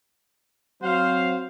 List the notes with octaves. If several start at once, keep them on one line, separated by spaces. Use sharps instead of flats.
F#3 C4 C5 F5